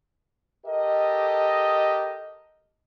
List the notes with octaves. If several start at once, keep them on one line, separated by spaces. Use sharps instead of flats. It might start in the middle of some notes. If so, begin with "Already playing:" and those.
G4 A4 A#4 D#5